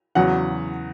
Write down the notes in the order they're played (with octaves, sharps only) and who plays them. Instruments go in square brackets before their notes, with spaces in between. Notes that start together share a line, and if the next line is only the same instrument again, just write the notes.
[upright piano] E2 C#3 F#3 F#5